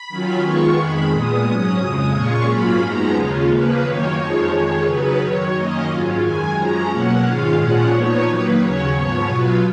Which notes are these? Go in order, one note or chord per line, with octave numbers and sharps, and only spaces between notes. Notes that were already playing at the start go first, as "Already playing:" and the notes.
Already playing: B5
D#3 F#3 C#4 F4
D#3 G#3 B3 F4 C#6
F2 D#3 G#3 B5
A#2 G#3 B3 D#6
G#2 F#3 C#4
F2 C#3 G#3
A#2 G#3 C#4 F4 C#6
G#2 F#3 A#3 C#4 F4 B5
F#2 F3 G#3 B3 D#4 A#5
D#2 C#3 G#3 C#4 F4
C#3 F3 A#3 B4
F#2 D#3 A#3 D#4 C#5
F2 F3 G#3 D#4 C#5
F2 D#3 G#3 C#5
C#3 F#3 B3 D#4 B4
F#2 D#3 F#3 C#5
F#2 D#3 A#3 C#4 D#5
G#2 F#3 C#4 F4
F#2 D#3 G#3 G#5
F#2 F3 G#3 C#4 A#5
B2 F#3 A#3 C#4 F#5
G#2 D#3 G#3 C#4 F4 F5
A#2 F3 G#3 C#4 F4 F#5
A#2 F3 B3 D#4 C#5
D#3 F#3 A#3 D#4 B4
D#2 C#3 F#3 C#4 C#5
G#2 F3 B3 C#5
B2 F#3 B3 F4 B4